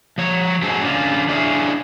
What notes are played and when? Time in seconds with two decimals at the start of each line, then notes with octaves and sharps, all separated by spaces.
0.18 F3 C#5
0.62 G#2 C4 F#4 G#4 A4
0.82 D3 C#4 F4
1.29 D4 E4 F4 G#4 C#5